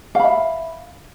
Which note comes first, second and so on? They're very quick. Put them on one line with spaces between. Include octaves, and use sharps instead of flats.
F5 B5 E5